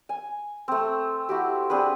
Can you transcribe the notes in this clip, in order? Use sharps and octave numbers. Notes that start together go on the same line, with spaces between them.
G#5
A3 C4
E4 F#4 G4
C4 D4 G#4 B4